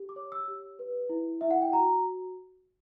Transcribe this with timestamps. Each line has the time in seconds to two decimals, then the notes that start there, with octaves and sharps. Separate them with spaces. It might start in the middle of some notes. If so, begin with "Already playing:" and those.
Already playing: G4
0.09 D6
0.16 C#5
0.32 E6
0.48 G4
0.79 B4
1.09 E4
1.41 E4 E5
1.51 F#5
1.62 G5
1.73 F#4 A#5